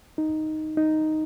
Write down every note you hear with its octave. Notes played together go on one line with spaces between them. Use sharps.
D#4
D#4